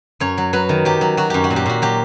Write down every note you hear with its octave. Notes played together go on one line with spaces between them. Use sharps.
F#2 C#5
F#3
F#3 B4
D#3
F#3 G4
F#3
F#3 F#4
F#2 G4
F#4
A#2
G4
A#2 F#4
F#3 G4